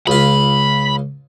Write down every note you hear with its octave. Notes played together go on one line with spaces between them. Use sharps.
C#2 F4 B5